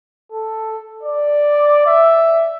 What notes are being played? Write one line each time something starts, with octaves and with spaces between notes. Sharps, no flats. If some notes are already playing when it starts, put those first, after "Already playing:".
A4
D5
E5